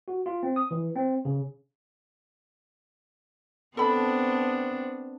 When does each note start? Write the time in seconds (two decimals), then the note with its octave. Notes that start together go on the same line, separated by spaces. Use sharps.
0.08 F#4
0.26 F4
0.43 C4
0.56 D#6
0.71 E3
0.96 C4
1.25 C#3
3.77 B3 C4 D4 A4 B5